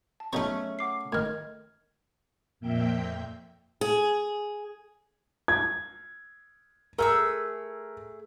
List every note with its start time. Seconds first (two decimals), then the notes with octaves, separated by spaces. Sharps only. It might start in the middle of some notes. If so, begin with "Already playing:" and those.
0.20 A5
0.33 B1 A3 C#4 D#4 C#6
0.79 F#5 D6 C7
1.12 A2 D#3 D#5 F6 G#6
2.60 F2 A#2 A#3 E5 G5 G6
3.81 G#4
5.48 G#6
6.98 A3 G#4 A#4 E6